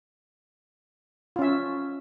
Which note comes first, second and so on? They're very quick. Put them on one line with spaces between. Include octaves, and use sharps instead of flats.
F4 C#4 E5